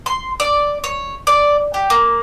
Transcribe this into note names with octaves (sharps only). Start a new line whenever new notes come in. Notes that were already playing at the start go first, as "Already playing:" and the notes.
C6
D5
C#5
D5
G4
A#3